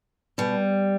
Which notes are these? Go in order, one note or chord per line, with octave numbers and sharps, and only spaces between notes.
B2 G3